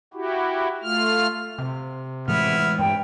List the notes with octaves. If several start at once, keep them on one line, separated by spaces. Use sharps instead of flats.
E4 F#4 G4
A3 F4 F6
C3
A2 E3 G#3 B3 E4 F6
G2 G5